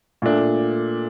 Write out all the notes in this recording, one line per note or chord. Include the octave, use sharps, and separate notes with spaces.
A#2 A3 D4